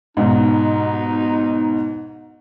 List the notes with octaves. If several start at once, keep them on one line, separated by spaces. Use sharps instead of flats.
G#2 B2 D#4